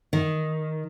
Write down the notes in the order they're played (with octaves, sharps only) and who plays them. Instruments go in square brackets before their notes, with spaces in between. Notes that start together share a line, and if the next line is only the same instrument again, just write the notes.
[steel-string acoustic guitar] D#3